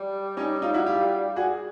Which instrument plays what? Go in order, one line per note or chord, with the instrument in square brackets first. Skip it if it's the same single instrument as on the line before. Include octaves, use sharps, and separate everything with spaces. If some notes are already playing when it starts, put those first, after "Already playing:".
Already playing: [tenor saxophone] G3
[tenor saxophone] G3 [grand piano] C#4 D#4
[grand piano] D#4 F4
E4 F#4
F4 G4
F#4 G#4